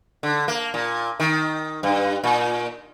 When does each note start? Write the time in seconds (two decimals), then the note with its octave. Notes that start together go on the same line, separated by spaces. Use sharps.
0.23 D3
0.48 A#3
0.74 A#2
1.20 D#3
1.83 G2
2.24 A#2